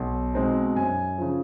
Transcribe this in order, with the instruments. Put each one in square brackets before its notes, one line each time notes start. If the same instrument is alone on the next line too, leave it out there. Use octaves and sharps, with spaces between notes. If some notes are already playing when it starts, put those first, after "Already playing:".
Already playing: [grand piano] B1
B2 G#3 C4 D#4
F#2 G#5
C#3 F3